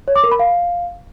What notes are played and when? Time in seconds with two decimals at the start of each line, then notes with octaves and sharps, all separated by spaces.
0.08 C#5
0.16 D6
0.24 A#4
0.31 B5
0.39 F5